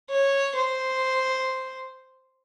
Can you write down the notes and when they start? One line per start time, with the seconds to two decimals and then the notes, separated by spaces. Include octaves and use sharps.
0.10 C#5
0.55 C5